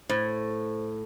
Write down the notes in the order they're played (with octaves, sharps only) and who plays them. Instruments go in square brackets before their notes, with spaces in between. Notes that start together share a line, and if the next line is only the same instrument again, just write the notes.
[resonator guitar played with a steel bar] A2 [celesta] C5